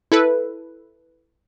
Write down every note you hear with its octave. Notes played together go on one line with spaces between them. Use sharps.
E4 A4 B4